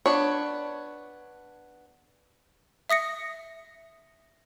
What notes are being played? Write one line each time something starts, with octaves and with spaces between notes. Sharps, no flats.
B3 D4 C#5
E5 D#6 A#6 C#7